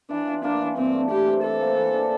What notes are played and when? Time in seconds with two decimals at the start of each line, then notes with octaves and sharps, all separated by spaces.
0.10 E3 D4
0.27 F4
0.44 A#3 D4
0.61 E3
0.77 G2 C4
0.93 A3
1.10 E3 G4
1.28 C4
1.44 C3 A4
1.61 A#3
1.77 E3
1.94 D4